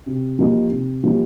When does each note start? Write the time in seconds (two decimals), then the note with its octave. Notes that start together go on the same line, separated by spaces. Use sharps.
0.06 C3
0.39 F3 A#3 D#4 G4
0.71 C3
1.03 F3 A#3 D#4 G4